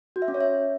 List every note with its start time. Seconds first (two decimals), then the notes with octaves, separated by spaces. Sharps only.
0.16 F#4
0.22 E5
0.28 C#4
0.34 C#5
0.40 E5